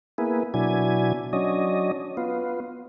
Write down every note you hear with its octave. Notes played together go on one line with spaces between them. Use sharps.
A#3 B3 E4 G#4
B2 F#3 D4 E4 G#5
F#3 C#4 D4 D#5
B3 F4